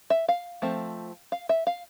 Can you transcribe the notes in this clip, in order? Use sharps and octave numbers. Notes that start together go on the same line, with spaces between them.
E5
F5
F3 A3 C4
F5
E5
F5